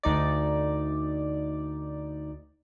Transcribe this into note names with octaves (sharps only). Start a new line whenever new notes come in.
D2 D#4 D5